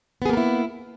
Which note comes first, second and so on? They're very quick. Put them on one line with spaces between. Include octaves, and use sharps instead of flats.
B3 G#4 A#3 A#4 E4